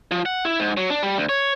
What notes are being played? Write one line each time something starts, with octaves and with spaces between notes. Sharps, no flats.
F3
F#5
E4
G#2
F#3
D4
G3
D2
C#5